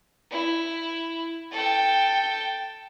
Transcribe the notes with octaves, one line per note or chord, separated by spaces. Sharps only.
E4
A4 G5